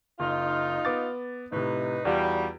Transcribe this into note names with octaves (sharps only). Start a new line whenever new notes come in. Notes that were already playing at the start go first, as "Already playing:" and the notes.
F#1 D#4 F4
B3 D6 A6
A2 C3 D#4 B4
E2 G3 F4 F#4